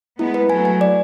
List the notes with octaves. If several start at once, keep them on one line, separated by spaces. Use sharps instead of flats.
G#3 B3 E4
B4
F#3 A3 G#5
G#5
D5